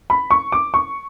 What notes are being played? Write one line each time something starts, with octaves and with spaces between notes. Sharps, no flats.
B5
C#6
D6
C#6